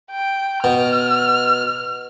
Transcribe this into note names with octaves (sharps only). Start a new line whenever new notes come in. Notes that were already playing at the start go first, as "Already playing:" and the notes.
G5
B2 F6